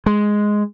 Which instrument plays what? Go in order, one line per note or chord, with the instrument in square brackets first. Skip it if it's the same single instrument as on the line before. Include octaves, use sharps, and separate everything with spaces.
[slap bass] G#3